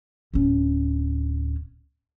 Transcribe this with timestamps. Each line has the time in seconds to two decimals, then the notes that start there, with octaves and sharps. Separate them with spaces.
0.34 D1 C#4